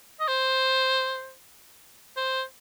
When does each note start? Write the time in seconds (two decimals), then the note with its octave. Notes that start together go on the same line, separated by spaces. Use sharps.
0.20 D#5
0.28 C5
2.17 C5